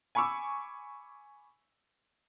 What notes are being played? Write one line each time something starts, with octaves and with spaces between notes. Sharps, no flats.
G#5 B5 C#6 D6 E6